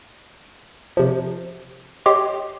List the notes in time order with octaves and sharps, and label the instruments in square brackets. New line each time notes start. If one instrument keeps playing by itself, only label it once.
[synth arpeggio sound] C3 F3
G4 C#5 D#5 C6 D6